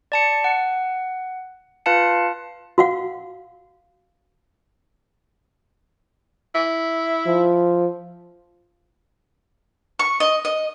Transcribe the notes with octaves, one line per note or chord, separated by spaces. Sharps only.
D5 A5 C#7
F#5
F4 B4 F5 A5 C#7
F#4 F5 F#5
E4
F3
C#6
D#5
D#5